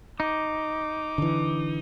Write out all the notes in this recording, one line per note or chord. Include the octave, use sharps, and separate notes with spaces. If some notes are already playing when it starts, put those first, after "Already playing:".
D#4 D6
D3 E3